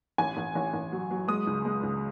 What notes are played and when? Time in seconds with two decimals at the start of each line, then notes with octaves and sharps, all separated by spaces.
0.18 A1 G#5
0.37 A1
0.55 A1
0.74 A1
0.92 F#3
1.11 F#3
1.28 G#3 D#6
1.47 C#2
1.65 G#3
1.83 C#2